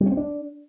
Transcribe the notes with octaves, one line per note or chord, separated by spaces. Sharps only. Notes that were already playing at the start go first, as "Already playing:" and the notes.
G3
C#4
C4
D4